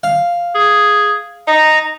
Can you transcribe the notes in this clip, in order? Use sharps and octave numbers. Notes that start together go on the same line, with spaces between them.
F5
G#4
D#4 A#5